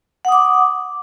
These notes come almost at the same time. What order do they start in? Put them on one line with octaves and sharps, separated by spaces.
F#5 D#6 D6